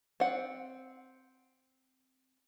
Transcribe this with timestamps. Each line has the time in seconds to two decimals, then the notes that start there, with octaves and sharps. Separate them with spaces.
0.20 C4 F#5